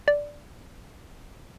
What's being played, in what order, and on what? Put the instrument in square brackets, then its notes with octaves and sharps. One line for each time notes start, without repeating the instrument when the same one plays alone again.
[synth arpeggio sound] D5